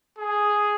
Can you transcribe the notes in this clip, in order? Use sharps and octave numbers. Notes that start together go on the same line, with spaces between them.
G#4